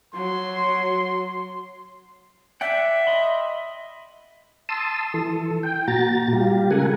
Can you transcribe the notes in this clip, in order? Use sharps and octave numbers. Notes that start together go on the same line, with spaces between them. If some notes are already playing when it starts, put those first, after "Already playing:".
F#3 C6
D5 E5 F#5 G5
D#5 B5 C6
A5 C6 D#6 E6
E3 A4
G5
A#2 F#4 A#5 A6
G3 F4 G4
C#3 G#3 A4 A#4 F#5 G#5